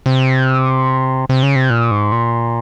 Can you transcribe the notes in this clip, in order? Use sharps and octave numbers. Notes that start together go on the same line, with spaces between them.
C3
C3
C#3
C3
A#2
G#2
A#2